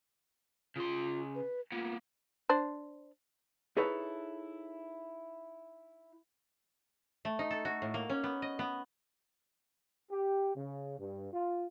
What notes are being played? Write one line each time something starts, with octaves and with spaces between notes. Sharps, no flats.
C#3 F4 C6
B4
A#3 B3 F4
D4 C5
D#4 E4 G#4 A4 B4 C#5
A3
D#4
A4
F#4
A2
A#3
C#4
B3
D#5
B3
G4
C#3
G2
F4